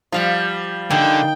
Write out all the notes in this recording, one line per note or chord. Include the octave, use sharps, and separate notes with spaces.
F3 G3 F4 F5 F#5
D3 A#3 D#4 G5 G#5